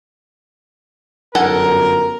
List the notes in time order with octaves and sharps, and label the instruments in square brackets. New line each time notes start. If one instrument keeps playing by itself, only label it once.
[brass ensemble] G1 F#2 A#4 [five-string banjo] A4 F#5 G#5